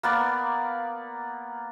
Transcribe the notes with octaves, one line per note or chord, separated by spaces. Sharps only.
A#3 B3 D5